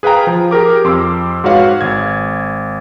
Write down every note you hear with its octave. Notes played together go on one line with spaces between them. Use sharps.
G#4 B4 F5 G5 A#5
F3
G4 G#4 A#4 D6
F2 C6 D6 E6
G#2 F#4 B4 C#5 F5 F#5
G#1 G#6